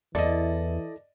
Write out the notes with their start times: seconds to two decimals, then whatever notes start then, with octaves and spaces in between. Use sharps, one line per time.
0.15 E2 E3 E4 A4 D5 D#5